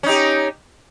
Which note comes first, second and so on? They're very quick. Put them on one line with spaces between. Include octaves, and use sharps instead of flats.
C#4 D#4 G4